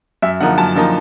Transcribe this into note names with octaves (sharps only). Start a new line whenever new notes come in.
F#2 E5
D3 F3 A#3 D#4 F#5
F#2 A5
D3 F3 A#3 D#4